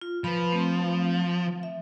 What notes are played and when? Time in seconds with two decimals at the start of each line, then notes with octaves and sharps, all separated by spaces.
0.02 F4
0.24 F3 B4 B5
0.52 A3 C4
1.63 E5